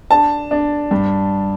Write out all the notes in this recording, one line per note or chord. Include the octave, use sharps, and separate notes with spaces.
D4 A5
D4
G2